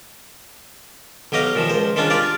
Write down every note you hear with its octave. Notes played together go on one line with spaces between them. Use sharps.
B1 F#3 G4 D#5 F5
A#2 D#3 F3
C#2 C5
D#3 G#3 C#4 D4 F4
F4 G4 D5 F5